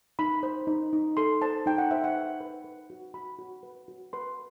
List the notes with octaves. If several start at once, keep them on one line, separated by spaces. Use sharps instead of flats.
D#4 B5
C5
D#4
D#4
A4 C6
C5 A5
D#4 G5
F#5
C5 E5
F#5
B4
B4
B4
F#4
F#4 B5
F#4
B4
F#4
B4 C6